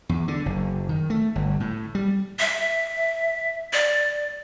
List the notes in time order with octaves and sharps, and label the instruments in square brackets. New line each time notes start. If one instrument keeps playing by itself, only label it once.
[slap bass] E2
D3
F#1
D#3
A3
G1
A2
G3
[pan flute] E5
D5